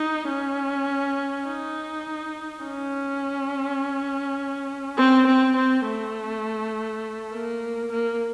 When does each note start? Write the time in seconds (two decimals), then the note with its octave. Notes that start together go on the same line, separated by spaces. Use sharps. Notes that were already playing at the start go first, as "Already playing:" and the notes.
Already playing: D#4
0.28 C#4
1.46 D#4
2.63 C#4
4.97 C4
5.26 C4
5.56 C4
5.85 A3
7.33 A#3
7.92 A#3